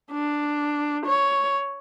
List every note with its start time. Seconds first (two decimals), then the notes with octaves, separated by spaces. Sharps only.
0.11 D4
1.06 C#5